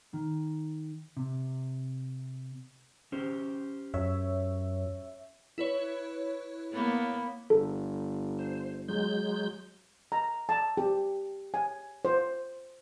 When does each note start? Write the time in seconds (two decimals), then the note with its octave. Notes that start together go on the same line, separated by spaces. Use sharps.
0.14 D#3
1.17 C3
3.12 C#4 G4 C5
3.94 F#2 C#5 E5
5.58 E4 B4 C#5
6.73 A#3 B3
7.50 G1 A4
8.39 C5
8.88 F#3 G#3 G6
10.12 A#5
10.49 A5
10.77 G4
11.54 G#5
12.05 C5